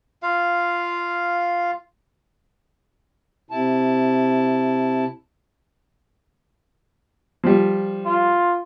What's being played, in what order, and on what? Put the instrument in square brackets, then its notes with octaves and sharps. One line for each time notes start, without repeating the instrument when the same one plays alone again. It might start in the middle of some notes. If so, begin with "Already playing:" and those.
[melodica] F4 F5
[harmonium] C3 E4 A5
[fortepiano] F3 G3
[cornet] F4